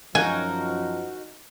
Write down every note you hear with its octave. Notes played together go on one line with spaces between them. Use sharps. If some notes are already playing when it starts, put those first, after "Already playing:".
F#2 F3 D#4 F#4 A#4 G#5